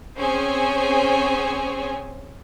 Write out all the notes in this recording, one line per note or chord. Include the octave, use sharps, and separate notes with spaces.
C4 C#4 G#4 C5 C#5 G#5